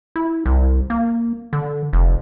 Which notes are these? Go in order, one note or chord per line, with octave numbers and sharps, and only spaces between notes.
E4
C2
A#3
D3
F1